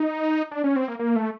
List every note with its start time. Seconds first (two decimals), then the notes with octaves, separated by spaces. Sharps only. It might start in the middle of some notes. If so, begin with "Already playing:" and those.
Already playing: D#4
0.51 D4
0.64 C#4
0.76 C4
0.88 A#3
0.99 A#3
1.16 A3